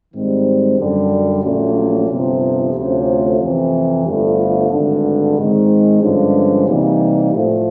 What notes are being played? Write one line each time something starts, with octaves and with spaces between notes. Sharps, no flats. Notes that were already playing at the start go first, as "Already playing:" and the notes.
G#2 D#3 G3 C4
F#2 D3 G3
A#1 A#2 F#3 A3 C#4
G1 F2 C3
D2 C3 F3 A3 C#4
F2 C3 E3
G1 G2 D3 F3 A3
G#1 G2 D3
G#2 D#3 G#3 C4 D#4
G2 D3 F3 G#3 C#4
C3 E3 G3 A#3 D#4
A2 F3 A3